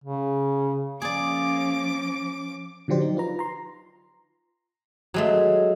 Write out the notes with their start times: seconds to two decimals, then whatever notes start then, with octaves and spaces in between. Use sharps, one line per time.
0.04 C#3
1.02 F3 A#3 C#4 G#4 D5 D6
2.88 D3 F3 F#3 G4 C5 D5
3.01 D#4
3.17 F4 B4 A#5
3.39 A#5 C6
5.14 F#3 G#3 A3